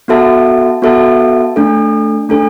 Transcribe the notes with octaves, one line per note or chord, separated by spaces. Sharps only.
B3 F#4 A4 E5 A5
B3 F#4 A4 E5 A5
A3 D4 A4
A3 D4 A4